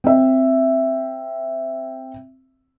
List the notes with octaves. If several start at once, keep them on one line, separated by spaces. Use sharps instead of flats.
C4 E5